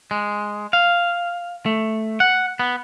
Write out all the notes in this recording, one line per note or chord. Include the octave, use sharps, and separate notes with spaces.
G#3
F5
A3
F#5
B3